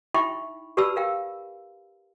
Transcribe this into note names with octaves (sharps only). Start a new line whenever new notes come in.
D#4 E4 E5 G5 B5 C#6
G4 B4 D5 A5 B5 E6
A#4 F5 G5